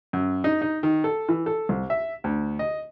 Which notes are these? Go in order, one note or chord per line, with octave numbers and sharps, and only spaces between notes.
F#2
D#4
D#4
D#3
A4
E3
A4
C2
E5
D2
D#5